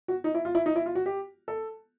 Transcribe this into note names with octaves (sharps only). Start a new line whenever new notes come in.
F#4
D#4
E4
F4
E4
D#4
E4
F4
F#4
G4
A4